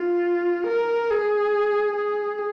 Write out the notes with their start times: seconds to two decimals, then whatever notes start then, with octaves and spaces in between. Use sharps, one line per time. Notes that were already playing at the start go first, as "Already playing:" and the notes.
Already playing: F4
0.67 A#4
1.10 G#4
1.96 G#4